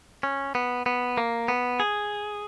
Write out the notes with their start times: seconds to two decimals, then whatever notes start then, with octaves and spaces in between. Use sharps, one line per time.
0.23 C#4
0.55 B3
0.86 B3
1.17 A#3
1.48 B3
1.80 G#4